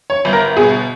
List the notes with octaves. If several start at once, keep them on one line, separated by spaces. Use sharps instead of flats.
C#5
G1
A#4
B2 G#4